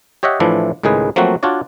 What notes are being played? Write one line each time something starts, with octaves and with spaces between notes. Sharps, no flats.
G4 C#5 D#5 E5 F#5
A2 E3 F3 D4 E4
C#2 A2 D#3 G#3 G#4 B4
F3 F#3 A3 A#3 C4 F#4
D4 F4 F#4 C#5 D5